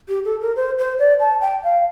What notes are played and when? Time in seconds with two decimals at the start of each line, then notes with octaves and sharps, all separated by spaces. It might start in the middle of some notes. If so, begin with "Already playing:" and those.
0.08 G4
0.25 A4
0.41 A#4
0.56 C5
0.78 C5
0.99 D5
1.20 A5
1.41 G5
1.63 F5